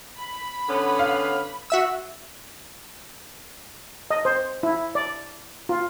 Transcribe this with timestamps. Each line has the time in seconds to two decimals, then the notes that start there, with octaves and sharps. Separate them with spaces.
0.17 B5
0.68 D3 B3 C#4
0.99 F5
1.70 F#4 E5 E6
4.10 D#5
4.25 C5
4.63 E4
4.95 D5
5.69 F4